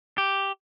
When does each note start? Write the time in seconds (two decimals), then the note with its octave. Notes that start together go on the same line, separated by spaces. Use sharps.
0.18 G4